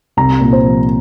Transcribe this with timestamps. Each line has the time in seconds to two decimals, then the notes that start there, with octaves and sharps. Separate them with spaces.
0.17 C2 A#5
0.41 A#2
0.53 C5
0.63 F3